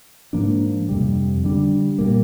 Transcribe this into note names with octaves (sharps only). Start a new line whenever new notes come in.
G#2 F3 A#3 D4
F2 C3 G3
D3 G3 D4
A#2 G3 A#3